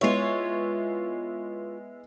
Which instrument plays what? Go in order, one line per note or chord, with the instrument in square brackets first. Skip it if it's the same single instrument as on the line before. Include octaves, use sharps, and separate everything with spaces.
[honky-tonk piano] G#3 B3 E4 [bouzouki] F4 C#5